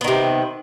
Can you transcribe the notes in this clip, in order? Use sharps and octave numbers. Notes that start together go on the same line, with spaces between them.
C3 D#3 B3